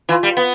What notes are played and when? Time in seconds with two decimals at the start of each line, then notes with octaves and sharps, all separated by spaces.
0.09 E3 F4
0.23 G3
0.37 B3